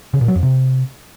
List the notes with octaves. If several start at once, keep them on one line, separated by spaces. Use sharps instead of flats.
C#3
A#2
F#3
F2
C3